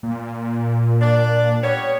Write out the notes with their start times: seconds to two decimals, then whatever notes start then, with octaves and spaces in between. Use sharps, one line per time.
0.03 A#2
1.01 D4 D5
1.62 G3 B3 C#5